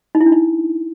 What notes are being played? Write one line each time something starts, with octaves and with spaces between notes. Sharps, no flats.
D#4
E4
D4
D#4